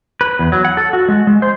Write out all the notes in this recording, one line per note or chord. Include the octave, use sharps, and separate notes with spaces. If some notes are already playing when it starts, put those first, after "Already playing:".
B4
E2
F#3
F#5
A4
F#4
G#3
G#3
C5